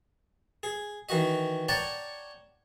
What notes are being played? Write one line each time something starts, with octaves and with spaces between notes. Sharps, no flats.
G#4
D#3 E3 F#4 D#5
C#5 D5 F#5 G5 A5 A#5